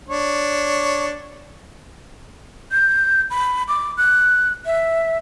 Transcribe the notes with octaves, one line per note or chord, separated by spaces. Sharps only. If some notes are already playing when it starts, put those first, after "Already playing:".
D4 C#5
G6
B5
D6
F#6
E5